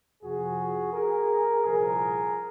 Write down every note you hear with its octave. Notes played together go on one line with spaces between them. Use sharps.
F2 C3 F3 F#4 G#4
G#4 A#4
C2 A#2 F3 G#4 A#4